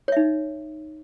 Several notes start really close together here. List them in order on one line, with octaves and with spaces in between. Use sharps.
C#5 E5 D#4